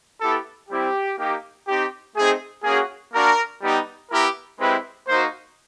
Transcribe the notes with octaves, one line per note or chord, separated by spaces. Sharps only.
B3 E4 G4 A4
G3 C4 E4 G4
A#3 D#4 G4
C4 D#4 G4
A3 C4 D#4 G#4
A#3 C#4 F#4 G#4
A#3 D4 F#4 A#4
G3 B3 D#4 G4
B3 E4 G4 A#4
G#3 C4 E4 G4 B4
A#3 D#4 F#4 C5